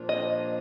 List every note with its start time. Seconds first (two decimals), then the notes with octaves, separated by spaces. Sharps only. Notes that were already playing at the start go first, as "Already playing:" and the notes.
Already playing: A#2 F3 A#3 D4 F4
0.09 D#5